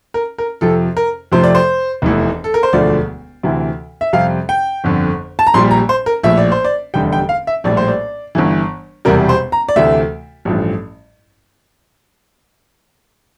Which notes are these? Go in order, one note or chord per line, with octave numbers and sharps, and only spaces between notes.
A#4
A#4
F2 C3 F3 A4
A#4
F2 C3 F3 A3 C5
D5
C5
F1 E2 E3 A3
A4
A#4
C5
E1 D2 D3 F3 A3 D5
D2 C3 E3
E5
F2 C3 G3 F5
G5
G1 F2 D3
A5
A#5
A#1 A#2 G3 C6
A#5
C5
A#4
A#1 A2 F3 E5
D5
C5
D5
F1 E2 D3 G3 G5
G5
F5
E5
A#1 A2 G3 D5
C5
D5
G1 G2 E3
E1 E2 C3 G3 A#4
C5
A#5
D5
D2 C3 E3 A3 E5
A1 G2 F3 A3